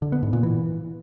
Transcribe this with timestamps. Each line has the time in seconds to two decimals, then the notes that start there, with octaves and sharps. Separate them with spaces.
0.02 D3
0.12 B3
0.23 G#2
0.33 A#2
0.43 E3